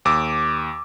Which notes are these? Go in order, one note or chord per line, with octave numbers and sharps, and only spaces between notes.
D#2 D6 E6